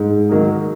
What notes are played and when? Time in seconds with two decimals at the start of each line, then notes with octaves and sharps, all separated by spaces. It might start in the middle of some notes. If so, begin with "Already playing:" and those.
Already playing: G#2
0.29 D#3 F#3 A#3 D#4